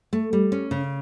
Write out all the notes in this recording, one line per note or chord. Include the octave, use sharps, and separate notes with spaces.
A3
G3
C#4
C#3